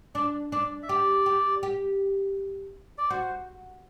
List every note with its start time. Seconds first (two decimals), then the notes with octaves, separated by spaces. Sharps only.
0.15 D4 D5
0.52 D4 D5
0.83 E5
0.88 G4 D5
1.26 G4
1.63 G4
2.98 D5
3.10 F#4 C5